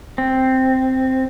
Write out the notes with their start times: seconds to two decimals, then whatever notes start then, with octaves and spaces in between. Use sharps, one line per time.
0.18 C4